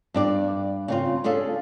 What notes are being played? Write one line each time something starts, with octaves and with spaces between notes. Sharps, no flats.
G2 D4 D5
C#3 C4 F4
C#4 D4 F4 G#4 A4